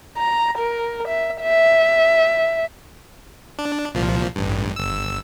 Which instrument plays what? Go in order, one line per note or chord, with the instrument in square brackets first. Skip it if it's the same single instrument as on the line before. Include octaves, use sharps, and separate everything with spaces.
[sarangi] A#5
A#4
E5
E5
[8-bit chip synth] D4
C2 A#2 F3
A1 G2
G1 E6